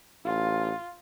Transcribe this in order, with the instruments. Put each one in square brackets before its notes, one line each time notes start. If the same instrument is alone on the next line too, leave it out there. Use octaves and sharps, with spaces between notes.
[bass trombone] A1 [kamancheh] F4